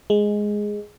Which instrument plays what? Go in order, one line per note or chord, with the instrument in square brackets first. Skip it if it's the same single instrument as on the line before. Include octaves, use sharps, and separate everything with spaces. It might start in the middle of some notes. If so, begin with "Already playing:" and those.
[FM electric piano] G#3